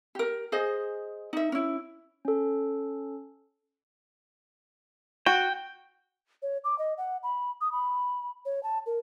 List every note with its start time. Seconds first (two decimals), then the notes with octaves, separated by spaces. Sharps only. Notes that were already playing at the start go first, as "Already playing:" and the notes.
0.15 G4 A#4
0.52 G#4 C5 D#5
1.33 D#4 E5
1.52 C#4 E4
2.25 C#4 A4
5.26 F#4 G5
6.42 C#5
6.64 D6
6.79 D#5
6.98 F#5
7.23 B5
7.61 D#6
7.72 B5
8.45 C#5
8.63 A5
8.86 A#4